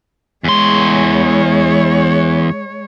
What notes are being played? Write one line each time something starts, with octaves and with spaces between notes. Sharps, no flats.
E2 G#3 C#5 C6